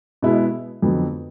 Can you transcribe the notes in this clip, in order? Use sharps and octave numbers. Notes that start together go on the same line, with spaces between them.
B2 G#3 B3 E4
F2 D3 F#3 B3